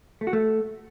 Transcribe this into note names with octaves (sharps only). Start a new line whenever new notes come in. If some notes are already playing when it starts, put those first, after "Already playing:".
A3
F#4
A3